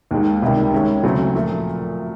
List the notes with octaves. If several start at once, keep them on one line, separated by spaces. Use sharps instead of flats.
D#2 D#3 G#3
C#2 C3 D#3 G3
D#3 G#3 C#4
D2 C#3 F#3 A3 C4
A#2 F3 A3